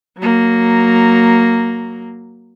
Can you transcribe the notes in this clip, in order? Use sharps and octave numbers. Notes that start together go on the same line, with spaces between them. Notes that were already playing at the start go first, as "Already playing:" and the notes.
F#3 A#3